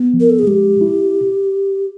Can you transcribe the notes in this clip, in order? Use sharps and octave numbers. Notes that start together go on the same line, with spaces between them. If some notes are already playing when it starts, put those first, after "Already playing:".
Already playing: B3
F3
A#4
A4
G#4
G#3 G4
E4